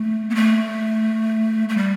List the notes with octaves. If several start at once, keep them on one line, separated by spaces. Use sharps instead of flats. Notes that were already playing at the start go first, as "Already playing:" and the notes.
Already playing: A3
B3
A3
A3
G3